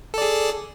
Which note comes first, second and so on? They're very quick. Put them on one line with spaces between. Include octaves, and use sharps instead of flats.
A4 D5 G#4